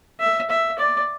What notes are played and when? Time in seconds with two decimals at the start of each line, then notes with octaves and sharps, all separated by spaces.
0.20 E5
0.50 E5
0.78 D5